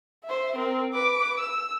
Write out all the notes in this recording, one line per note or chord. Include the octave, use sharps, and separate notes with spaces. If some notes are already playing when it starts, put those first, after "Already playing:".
C5 E5
C4 A#4
B4 D6
E6